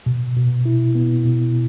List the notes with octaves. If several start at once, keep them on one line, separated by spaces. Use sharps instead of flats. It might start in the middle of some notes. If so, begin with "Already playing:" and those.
B2
B2
E4
B3
B2